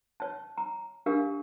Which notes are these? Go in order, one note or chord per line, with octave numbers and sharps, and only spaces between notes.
C#5 A5
A#5
D4 G4 A#4 F5